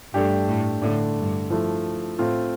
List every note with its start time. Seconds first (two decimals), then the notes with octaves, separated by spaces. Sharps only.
0.13 G2 A3 D4 G4
0.48 A2
0.82 A2 D3 A3 D4
1.16 G2
1.50 F3 A3 E4
2.19 A2 A3 C4 F4